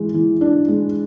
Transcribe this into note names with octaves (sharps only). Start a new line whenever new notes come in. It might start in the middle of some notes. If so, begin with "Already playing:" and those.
Already playing: E3 G#3
E3
D4
G#3